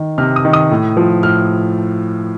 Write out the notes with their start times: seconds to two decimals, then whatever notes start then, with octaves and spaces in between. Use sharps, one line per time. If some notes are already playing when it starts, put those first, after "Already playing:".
Already playing: D#3
0.18 C3 F6
0.36 D#6
0.45 D#3
0.53 D#6
0.71 A2
0.97 F3
1.23 A2 F6